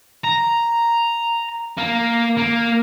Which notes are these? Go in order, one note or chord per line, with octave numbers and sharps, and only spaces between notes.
A#5
A#3
A#3